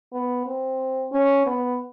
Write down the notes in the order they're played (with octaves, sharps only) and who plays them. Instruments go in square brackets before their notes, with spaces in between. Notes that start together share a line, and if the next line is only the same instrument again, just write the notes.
[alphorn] B3
C4
C#4
B3